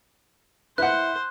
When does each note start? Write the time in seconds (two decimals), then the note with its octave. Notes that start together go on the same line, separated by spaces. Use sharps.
0.78 E4 B4 C5 F#5 F#6